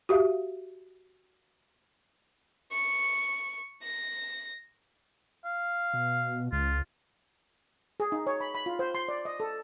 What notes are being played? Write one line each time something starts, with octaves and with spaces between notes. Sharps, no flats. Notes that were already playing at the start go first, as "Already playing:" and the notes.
F#4 G4 E5 F5
C#6
A#6
F5
B2
C#2 F4
G#4
D#4
C#5
B5
B5
F4
C5
C6
D5
D#5
A4